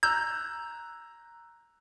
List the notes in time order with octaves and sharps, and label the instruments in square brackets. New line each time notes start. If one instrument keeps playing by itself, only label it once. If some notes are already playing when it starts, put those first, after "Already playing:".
[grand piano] A#5 E6 F#6 [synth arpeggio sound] G6